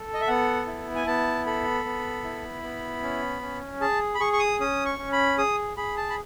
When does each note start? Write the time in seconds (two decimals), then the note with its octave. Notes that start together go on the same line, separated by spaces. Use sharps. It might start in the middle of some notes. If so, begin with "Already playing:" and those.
Already playing: A4
0.14 D#5
0.21 E5
0.27 B3 F#5
0.67 E4
0.96 G#5
1.07 B3 A5
1.46 A4 B5
1.85 B3
2.24 E4
2.63 B3
3.03 C#4
3.42 C#4
3.81 G#4 A5
4.15 B5
4.20 G#4 C#6
4.33 C#6
4.40 D#6
4.60 C#4 D#6
4.85 C#6
4.98 C#4
5.12 B5
5.38 G#4 D#6
5.77 G#4 B5
5.97 A5
6.10 B5